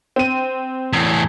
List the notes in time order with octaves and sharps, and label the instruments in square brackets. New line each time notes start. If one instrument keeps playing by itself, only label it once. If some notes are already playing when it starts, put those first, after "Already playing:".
[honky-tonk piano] C4 D#7
[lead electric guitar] E2 A2